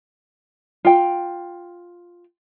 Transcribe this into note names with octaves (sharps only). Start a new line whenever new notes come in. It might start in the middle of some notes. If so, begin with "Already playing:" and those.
F4 G5